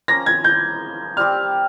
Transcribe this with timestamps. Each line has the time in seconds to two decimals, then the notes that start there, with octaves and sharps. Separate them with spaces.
0.08 F3 A#3 C#4 A#6
0.26 G#6
0.44 G6
1.17 G3 C4 G4 F6